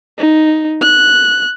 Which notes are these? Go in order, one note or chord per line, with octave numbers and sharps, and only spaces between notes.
D#4
F#6